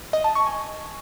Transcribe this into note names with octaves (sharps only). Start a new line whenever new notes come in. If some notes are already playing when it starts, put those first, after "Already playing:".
D#5
A5
C#6
G#5